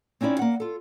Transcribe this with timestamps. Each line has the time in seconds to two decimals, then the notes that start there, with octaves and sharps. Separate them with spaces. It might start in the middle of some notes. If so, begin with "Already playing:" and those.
0.21 C4 C#4 D#4 E4 D5
0.39 A#3 F#5
0.60 F4 A4